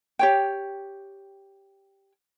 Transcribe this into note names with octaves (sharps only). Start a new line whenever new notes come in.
G4 C#5 G5